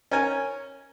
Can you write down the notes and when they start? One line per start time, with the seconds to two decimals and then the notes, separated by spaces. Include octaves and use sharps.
0.11 C#4 A#4 G#5